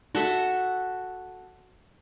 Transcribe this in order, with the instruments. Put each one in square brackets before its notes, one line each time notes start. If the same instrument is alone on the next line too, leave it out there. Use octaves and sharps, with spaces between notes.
[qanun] F#4 A4 E5 F#5